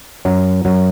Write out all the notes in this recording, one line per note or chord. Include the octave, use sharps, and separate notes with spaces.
F#2 F#3
F#2 F#3